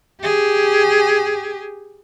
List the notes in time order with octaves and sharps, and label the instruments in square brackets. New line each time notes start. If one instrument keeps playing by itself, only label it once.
[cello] G4 G#4